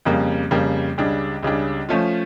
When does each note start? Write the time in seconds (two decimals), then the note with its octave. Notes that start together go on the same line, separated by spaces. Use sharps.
0.05 F2 C#3 G3 A#3
0.51 F2 C#3 G3 A#3
0.98 C#2 C#3 G3 D4
1.43 C#2 C#3 G3 D4
1.89 F3 A3 C#4 F4